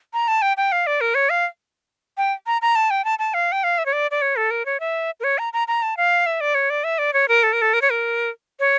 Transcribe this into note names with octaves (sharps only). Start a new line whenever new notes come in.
A#5
A5
G5
G5
F5
D5
A#4
C#5
F5
G5
A#5
A#5
A5
G5
A5
A5
F5
G5
F5
E5
C#5
D5
D5
C#5
A4
A#4
C#5
E5
A#4
C#5
A#5
A#5
A#5
A5
F5
E5
D5
C#5
D5
E5
D5
C#5
A#4
A4
A#4
A4
A#4
C#5
A#4
C#5